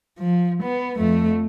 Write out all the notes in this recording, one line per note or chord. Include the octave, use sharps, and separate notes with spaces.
F3
B3
F2 A3